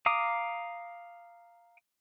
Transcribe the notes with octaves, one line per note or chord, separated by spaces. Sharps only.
F5 A#5 D6 D#6